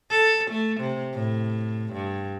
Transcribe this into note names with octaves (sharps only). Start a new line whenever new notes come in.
A4
A3
C3
A2
G2